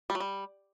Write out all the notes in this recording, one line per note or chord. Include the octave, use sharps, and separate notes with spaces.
G3
F#3
G3